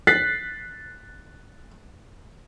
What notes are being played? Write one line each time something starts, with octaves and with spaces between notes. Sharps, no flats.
F#6 A6 B6 C7